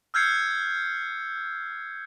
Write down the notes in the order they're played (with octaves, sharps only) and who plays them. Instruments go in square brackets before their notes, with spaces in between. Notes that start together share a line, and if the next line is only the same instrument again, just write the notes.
[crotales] E6 F6 G6 G#6 C7 C#7